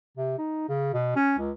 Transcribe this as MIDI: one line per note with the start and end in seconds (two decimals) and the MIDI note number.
0.17 0.36 48
0.38 0.66 63
0.69 0.93 49
0.94 1.14 47
1.16 1.35 61
1.38 1.51 37